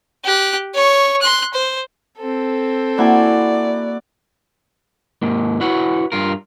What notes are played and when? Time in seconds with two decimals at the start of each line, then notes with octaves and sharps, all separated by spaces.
0.24 G4 F#6
0.74 C#5 C#6
1.21 C6 F#6
1.54 C5
2.18 C4 A4
2.98 A#3 E4 F#4 D5 G#5 D6
5.22 D#2 G#2 A#3
5.61 E4 F#4 B4 C#5 F#5
6.12 G2 F4 A#4